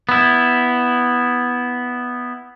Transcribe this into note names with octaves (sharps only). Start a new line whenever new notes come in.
B3 E4